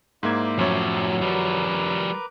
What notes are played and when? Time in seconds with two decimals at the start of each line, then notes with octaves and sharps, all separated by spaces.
0.23 G#2 A#3 E4 C5 D5 G#6
0.59 F#2 A2 F3 F#3 C#5
1.21 F3 G3 A#4 B4 D6